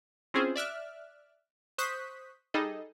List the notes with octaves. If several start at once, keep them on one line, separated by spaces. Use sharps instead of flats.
C4 C#4 E4 F4 G#4 C5
D5 E5 F6 F#6
C5 C#6 D#6 F#6 G6 B6
G3 D#4 G#4 A4 D#5